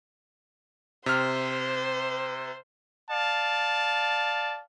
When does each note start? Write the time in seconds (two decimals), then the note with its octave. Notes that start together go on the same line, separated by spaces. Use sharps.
1.06 C3 C5 F6
3.09 D5 F5 A5